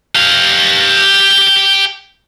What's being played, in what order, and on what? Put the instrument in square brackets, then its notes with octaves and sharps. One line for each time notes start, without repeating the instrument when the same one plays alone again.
[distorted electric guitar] G4 F5